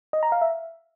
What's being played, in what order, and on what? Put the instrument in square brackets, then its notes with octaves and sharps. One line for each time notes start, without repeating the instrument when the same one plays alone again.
[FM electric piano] D#5
A#5
F5
E5